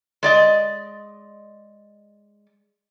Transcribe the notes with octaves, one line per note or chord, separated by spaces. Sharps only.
G#3 D5 D#5